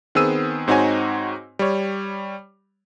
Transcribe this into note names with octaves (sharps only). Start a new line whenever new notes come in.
D#3 B3 C4 G#4 E6 D#7
G#2 C4 D#4 F#4 C#5 G#5
G3 C#5